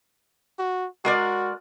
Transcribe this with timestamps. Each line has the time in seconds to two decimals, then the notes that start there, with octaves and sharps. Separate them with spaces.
0.59 F#4
1.05 G#3 F#4 A#4 D5